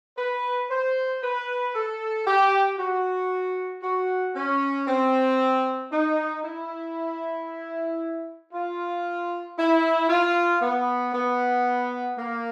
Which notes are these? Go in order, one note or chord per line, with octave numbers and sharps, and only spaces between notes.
B4
C5
B4
A4
G4
F#4
F#4
C#4
C4
D#4
E4
F4
E4
F4
B3
B3
A#3